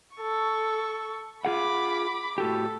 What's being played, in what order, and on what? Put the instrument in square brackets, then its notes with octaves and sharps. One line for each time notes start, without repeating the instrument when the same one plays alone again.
[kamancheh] A4 C#6
[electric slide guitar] F4 G#4 F#5 [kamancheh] B5 D6
[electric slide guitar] A2 F#4 G4 [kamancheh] A4